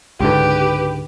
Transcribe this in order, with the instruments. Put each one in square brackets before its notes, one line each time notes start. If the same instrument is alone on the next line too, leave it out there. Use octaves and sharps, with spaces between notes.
[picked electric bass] C#2 G#2 D3 [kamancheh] G4 B4